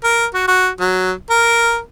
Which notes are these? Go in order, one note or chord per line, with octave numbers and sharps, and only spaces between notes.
A#4
F#4
F#4
F#3
A#4